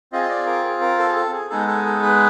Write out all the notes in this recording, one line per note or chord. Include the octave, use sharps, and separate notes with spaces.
C4 F4 G#4 D#5
D#5
D5
A#4
G#4
A#4
A4
G#4
A4
G#4
G#3 B3 D#4 G#4 A4
A4
A4
B4